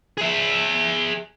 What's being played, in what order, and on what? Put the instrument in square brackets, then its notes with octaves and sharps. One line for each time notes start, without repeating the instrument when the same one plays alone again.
[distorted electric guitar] G#4 E5